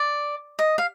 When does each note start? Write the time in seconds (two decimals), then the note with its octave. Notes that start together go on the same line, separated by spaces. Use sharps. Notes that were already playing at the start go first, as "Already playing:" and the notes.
Already playing: D5
0.59 D#5
0.78 F5